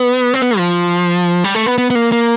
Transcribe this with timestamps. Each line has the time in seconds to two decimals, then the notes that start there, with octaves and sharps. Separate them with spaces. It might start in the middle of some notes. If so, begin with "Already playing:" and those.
Already playing: B3
0.34 C4
0.42 B3
0.58 F3
1.44 G3
1.55 A3
1.66 B3
1.78 B3
1.90 B3
1.95 A#3
2.12 A#3